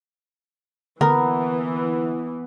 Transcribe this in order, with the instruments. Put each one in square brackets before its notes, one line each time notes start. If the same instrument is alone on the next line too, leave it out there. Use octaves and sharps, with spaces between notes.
[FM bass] D3 [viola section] E3 [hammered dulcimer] B3 [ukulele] A#4